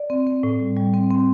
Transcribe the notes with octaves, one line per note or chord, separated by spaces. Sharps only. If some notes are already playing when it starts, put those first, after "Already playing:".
Already playing: D5
C4
C4
A2
G3
G3
C4
C4